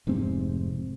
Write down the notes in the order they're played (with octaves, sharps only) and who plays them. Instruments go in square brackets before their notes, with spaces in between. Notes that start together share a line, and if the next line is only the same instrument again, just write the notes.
[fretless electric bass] F1 G#2 C3 C4